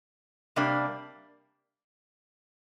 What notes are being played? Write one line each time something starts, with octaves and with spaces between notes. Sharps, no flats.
C3 G3 A#3 D4